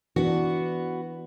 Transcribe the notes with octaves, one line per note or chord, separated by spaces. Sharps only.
E3 B3 D4 F#4